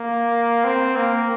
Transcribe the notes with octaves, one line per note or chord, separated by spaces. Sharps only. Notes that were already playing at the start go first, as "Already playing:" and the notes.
Already playing: A#3
C4
A#3